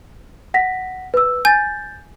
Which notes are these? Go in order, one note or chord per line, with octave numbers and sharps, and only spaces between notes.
F#5 A#6 B6
B4 E6
G#5 G6 A6